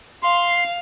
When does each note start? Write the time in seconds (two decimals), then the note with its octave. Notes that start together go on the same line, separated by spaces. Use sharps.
0.23 F5 C6